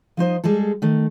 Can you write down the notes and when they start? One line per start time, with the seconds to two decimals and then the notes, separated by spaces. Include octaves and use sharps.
0.17 F3 D#4 C5 D#5
0.44 G3 G#3 G#4 A4
0.82 D#3 A3